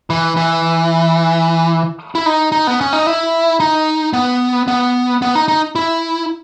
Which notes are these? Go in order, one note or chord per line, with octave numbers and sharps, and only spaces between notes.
E3
E3
E4
D#4
D#4
B3
C#4
D#4
E4
D#4
B3
B3
B3
D#4
D#4
E4